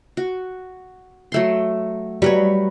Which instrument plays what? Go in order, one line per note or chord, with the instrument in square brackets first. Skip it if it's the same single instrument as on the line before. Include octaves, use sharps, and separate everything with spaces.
[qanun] F#4
F#3 A3 C6
[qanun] F#3 B4 C#5 [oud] G3